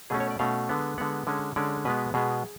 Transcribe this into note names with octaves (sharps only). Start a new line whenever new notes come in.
B2 A3 C#4 G#4
C#5
D5
B2 A3 C#4 F5
D3 G#3 B3
D3 G#3 B3 F#5
D3 G#3 C#4
D3 G#3 C#4 D5
B2 G#3 B3 B4
B2 G#3 B3 G#4